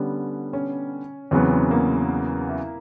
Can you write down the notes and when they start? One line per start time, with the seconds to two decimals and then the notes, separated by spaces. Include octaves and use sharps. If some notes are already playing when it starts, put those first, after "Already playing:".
Already playing: D3 G3 B3 C#4
0.53 C#4
1.31 E2 C#3 F#3 B3 C4
1.51 C4
1.71 A#3
2.49 E4